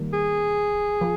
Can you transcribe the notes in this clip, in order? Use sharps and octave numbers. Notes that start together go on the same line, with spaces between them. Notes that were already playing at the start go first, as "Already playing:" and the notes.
Already playing: D#3 G3 A#3
G#4
F3